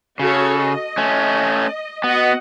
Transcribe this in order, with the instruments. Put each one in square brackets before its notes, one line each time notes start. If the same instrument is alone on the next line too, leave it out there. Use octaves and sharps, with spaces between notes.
[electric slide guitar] C#3 [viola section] F#4 A4 C#5
[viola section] D#5
[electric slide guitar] A3 C#4
[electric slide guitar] B3 [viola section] F#4 D#5 F#5